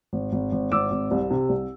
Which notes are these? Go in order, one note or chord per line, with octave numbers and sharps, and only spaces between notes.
G#1
G#1
G#1
G#1 D6 E6
G#1
C2
C3
C2